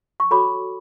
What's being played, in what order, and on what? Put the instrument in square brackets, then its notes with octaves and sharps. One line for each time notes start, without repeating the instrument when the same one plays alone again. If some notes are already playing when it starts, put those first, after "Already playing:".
[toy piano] C#6
F#4 A4 C#5 B5 D6